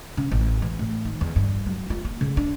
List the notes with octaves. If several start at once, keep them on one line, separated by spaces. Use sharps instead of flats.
C#3
A1
E3
A2
D#3
E2
G2
F#3
F4
A#3
C#3
D4